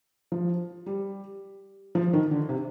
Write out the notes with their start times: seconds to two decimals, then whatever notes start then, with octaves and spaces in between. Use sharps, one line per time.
0.32 F3
0.86 G3
1.95 F3
2.13 D#3
2.31 D3
2.49 C3